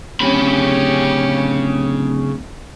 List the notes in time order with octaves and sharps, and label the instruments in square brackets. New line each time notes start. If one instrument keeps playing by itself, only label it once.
[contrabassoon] D1 [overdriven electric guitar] C#3 B5 [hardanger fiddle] C#4 G4